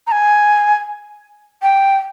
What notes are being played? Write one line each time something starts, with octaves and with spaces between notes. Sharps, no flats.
A#5
G#5
G5